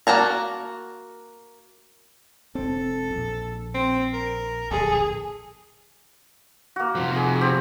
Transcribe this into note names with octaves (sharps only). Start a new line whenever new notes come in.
A#3 F#4 A5 A#5
E1 C4 A4
A#1
C4
A#4
D1 A#1 G#4 A4
A#3 F#4
C3 F3
G#4
C4 G4